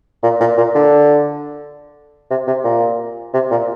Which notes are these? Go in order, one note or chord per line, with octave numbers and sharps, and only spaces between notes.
A#2
A#2
A#2
D3
C3
C3
A#2
C3
A#2